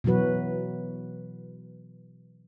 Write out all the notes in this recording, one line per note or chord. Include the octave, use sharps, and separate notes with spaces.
B2 E3 F#3 F#4 B4